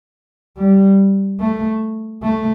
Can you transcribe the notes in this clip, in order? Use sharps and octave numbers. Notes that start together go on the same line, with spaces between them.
G3
A3
A3